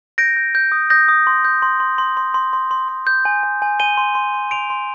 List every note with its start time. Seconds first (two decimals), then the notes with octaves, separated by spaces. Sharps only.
0.18 G6 A#6 D7
0.37 G6
0.55 G6
0.72 D#6
0.90 D#6 G6 A#6
1.08 D#6
1.27 C6
1.45 G6
1.62 C6
1.80 C6
1.98 C6
2.17 C6
2.34 C6
2.53 C6
2.71 C6
2.88 C6
3.07 G6
3.25 G#5
3.43 G#5
3.62 G#5
3.80 G#5 D#7 G7
3.97 C6
4.15 C6
4.34 C6
4.51 C6 D7 F7
4.70 C6